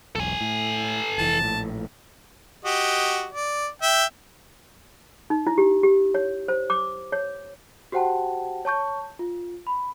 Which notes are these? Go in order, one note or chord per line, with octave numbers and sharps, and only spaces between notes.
E1 B1 A4 G#5
A2
F1 E3 A5
A#1 A2
F#4 G4 D#5
D5
E5 G5
D#4
E4
G4
G4
C#5
C5
D6
C#5
F#4 G4 C5 F#5 G5 A5
C#5 A5 C#6 G6
F4
B5